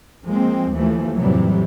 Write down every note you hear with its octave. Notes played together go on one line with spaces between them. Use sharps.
F3 G#3 A#3 C4
D#2 E3 F3 A3
F2 A2 C3 E3 F#3 G3